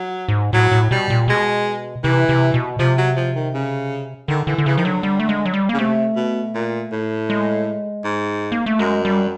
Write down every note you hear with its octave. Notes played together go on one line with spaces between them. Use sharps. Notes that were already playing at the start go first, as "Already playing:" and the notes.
Already playing: F#3
G#2
A2 F#3
A2
B2 G3
A#2
B2 G#3
C3 E3
C3
B2
C3 F3
F#3
F3
D#3
C#3
D3 D#3
D3 E3
D3
C#3 E3
D#3 F3
D3 F#3
G3
A3
G#3
F#3
G3
C#3 A#3
C3 A3
B2
A#2
A2
G#3
G#2
A#3
A3
F#2 G#3
G3